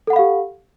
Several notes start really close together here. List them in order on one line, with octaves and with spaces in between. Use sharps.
A4 F#5 B5 F5 G4